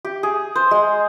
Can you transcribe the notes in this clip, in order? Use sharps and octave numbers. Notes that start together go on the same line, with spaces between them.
G4
G#4
C5
G#3